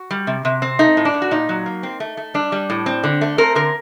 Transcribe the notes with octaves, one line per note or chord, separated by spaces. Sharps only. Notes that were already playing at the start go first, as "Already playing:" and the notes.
Already playing: F#4
G3
C3
C3
C4
A3 D#4
A2
D4
A2
F#4
A#2 D#4
F#3
A#3
C4
A3
A3
G3 D4
G3
A2
C4
D3
A3
C4 A#4
D3 A#4